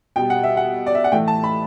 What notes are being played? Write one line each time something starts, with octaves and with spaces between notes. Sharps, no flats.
B2 G3 G5
F#5
E5
F#5
D5
E5
F#5
A2 E3 A3 G5
A5
B5